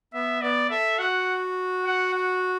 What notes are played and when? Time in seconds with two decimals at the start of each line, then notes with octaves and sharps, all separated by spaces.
0.14 B3 E5
0.42 B3 D5
0.70 A4 E5
0.99 F#4 F#5
1.85 F#5
2.14 F#5